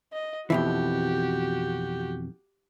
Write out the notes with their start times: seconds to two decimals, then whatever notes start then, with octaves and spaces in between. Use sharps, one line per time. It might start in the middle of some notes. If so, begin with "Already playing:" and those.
0.13 D#5
0.50 F2 B2 E3 F#4 G4